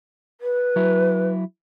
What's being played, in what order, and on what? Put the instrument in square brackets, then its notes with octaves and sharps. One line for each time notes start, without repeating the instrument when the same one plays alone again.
[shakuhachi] B4
[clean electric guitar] F#3 E4